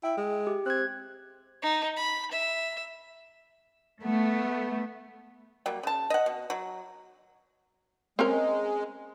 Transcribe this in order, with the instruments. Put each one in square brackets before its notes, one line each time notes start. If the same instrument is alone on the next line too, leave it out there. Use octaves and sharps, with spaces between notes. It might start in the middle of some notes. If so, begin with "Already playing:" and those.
[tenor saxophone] E4 [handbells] G5
[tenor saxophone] G#3
[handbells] G4
[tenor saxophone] C4 [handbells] F#6 G#6
[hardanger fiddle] D#4
B5
E5
[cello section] A3 [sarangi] B3
[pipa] F#3 G3 A#3
C#3 A5
D#5 F#5
B2
F#3
[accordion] G#3 [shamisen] C4 C#4 A#4